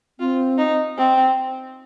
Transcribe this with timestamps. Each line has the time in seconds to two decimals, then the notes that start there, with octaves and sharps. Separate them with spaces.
0.19 C4 F4
0.58 D#4
0.98 C4